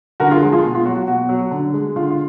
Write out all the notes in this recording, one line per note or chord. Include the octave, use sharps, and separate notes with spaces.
D3 F#4 A#4
F4 G#4
F3 G#3
F4 G#4
B2
F4
F#3 F#4
F#4
B2 F#4
F#3
D3
G#3
D3 F4
F4